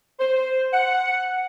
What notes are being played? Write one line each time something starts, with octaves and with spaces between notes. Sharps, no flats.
C5
F#5